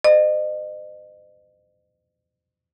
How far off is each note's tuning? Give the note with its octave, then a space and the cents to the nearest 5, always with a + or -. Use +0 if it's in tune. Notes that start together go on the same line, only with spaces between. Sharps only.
C5 -40 D#5 -35